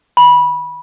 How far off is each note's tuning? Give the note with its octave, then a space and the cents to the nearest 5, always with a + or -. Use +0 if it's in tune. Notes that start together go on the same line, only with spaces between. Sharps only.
B5 -20